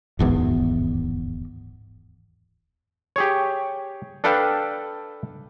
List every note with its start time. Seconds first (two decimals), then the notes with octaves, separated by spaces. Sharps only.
0.19 D1 G#1 E2
3.16 G4 G#4 C#5
4.24 D4 A4 B4 F5 G5 A5